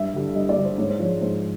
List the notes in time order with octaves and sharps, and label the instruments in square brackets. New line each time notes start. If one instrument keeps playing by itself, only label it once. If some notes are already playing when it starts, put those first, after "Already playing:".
Already playing: [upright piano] G2 E5
D3 G3
G2 D#5
D5
D3 G3
C5
G#2 C#5
C5
F3 G#3 C#5
G#2 C5